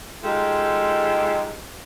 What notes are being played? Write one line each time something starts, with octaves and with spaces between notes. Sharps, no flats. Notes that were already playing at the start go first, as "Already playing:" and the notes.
G#3 D#4 F4 G4 A4